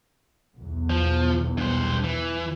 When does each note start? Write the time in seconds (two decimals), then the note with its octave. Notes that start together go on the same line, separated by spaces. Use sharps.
0.56 B1 E2
0.90 F3
1.58 G2 C5
2.04 E3